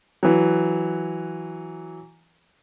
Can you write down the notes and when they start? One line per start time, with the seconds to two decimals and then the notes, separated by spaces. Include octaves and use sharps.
0.23 E3 F#3